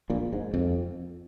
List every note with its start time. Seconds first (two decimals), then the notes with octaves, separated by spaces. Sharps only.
0.10 A#1 A#2
0.33 G#2
0.54 F2